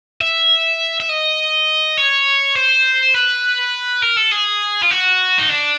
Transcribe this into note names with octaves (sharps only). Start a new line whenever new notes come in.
E5
E5
D#5
C#5
C5
B4
A#4
A4
G#4
F4
F#4
D#4
D4